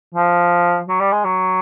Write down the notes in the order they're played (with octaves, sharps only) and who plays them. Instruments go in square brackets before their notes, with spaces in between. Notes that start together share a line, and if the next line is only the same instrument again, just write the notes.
[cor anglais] F3
F#3
G3
G#3
F#3